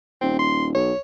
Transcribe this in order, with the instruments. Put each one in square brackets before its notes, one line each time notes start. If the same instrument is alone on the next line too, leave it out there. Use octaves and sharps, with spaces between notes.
[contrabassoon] D#1 [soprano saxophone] C4
[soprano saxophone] C6
[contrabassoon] B1 [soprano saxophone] C#5